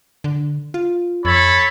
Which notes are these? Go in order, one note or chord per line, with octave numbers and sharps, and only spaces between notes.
D3
F4
F2 A4 C#5 B5